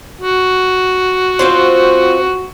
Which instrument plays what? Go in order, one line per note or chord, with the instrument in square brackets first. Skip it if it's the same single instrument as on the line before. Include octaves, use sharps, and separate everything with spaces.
[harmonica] F#4
[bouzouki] C4 F4 C5